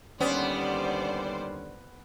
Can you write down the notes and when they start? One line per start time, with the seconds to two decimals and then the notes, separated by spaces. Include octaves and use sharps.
0.20 D#2 D3 G3 B3 C#4 C5 D5